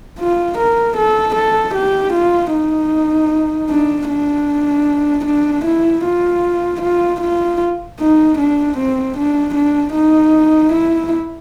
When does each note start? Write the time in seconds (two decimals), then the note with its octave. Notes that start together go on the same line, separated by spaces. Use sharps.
0.19 F4
0.58 A#4
0.97 A4
1.35 A4
1.75 G4
2.13 F4
2.53 D#4
3.70 D4
4.10 D4
5.26 D4
5.65 E4
6.05 F4
6.82 F4
7.21 F4
8.00 D#4
8.39 D4
8.78 C4
9.17 D4
9.56 D4
9.94 D#4
10.73 E4